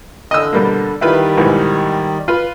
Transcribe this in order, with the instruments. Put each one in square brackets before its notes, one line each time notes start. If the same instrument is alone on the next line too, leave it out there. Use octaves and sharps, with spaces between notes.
[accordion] D3 [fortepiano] D#5 E6
[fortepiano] B2 G3 A#3
[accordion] D#3 G3 [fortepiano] E4 F4 B4
[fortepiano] B1 G#2 E3
F4 B4